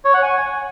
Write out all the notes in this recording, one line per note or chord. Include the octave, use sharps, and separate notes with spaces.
C#5
F#5
G#5